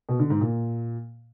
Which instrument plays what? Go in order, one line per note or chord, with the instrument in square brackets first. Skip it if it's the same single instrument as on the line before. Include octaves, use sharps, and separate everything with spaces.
[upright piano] B2
D3
G#2
A#2